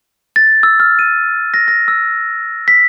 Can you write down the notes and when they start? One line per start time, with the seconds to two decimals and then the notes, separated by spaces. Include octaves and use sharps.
0.36 A6
0.63 E6
0.80 F6
0.99 D#7
1.54 A#6
1.68 A#6
1.88 E6
2.68 B6